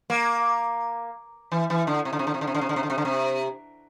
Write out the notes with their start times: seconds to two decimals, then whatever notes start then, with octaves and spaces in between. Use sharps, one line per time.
0.10 A#3
1.52 E3
1.70 E3
1.87 D3
2.05 C3
2.13 D3
2.19 C3
2.27 D3
2.34 C3
2.41 D3
2.47 C3
2.55 D3
2.61 C3
2.69 D3
2.76 C3
2.83 D3
2.90 C3
2.98 D3
3.05 C3